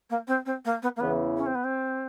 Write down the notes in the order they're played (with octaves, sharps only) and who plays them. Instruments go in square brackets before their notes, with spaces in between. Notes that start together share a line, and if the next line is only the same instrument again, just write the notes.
[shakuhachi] A#3
C4
C4
A#3
B3
A#3
[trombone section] E2 C#3 E3 [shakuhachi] B3
[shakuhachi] C#4
C4
B3
C4